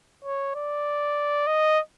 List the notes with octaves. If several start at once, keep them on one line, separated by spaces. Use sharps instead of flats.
C#5
D5
D#5